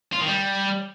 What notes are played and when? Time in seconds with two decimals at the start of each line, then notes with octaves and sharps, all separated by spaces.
0.13 F4
0.20 D#3
0.27 G3